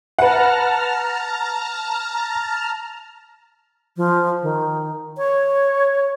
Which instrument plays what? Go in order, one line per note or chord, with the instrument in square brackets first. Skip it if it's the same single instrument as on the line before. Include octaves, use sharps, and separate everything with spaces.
[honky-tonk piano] B4 F#5 [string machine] A5 A#5 F6
[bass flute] F3
D#3
C#5